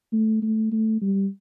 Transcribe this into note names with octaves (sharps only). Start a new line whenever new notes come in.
A3
A3
A3
G3